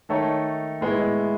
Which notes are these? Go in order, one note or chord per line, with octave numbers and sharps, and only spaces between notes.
D#3 A3 D#4 A4 C#5
A2 G#3 B3 E4